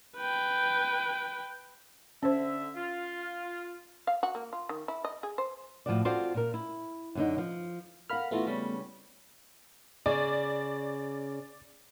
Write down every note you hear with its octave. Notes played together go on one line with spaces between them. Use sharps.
B4 G5
D3 C#4 C5 E5
F4
F5
F#4
A#3
F4
D#3
E4
D#5
G#4
C5
A2 F3 G#3 C4 F#4 D5
C4 F4 F#4 A4 C5 D5
A#2 A#4
E4
F#2 D3 D#4
F3
A#4 F5 F#5 B5 F6
E3 A3 B3 F4 F#4
C#3 G3 C#4
C#3 D5